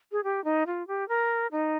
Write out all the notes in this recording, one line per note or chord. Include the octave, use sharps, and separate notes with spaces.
G#4
G4
D#4
F4
G4
A#4
D#4